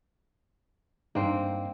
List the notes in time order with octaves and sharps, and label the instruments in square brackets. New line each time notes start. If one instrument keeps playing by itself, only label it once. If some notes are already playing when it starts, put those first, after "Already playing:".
[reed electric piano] G2 D4 D#4 [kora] A#3 C4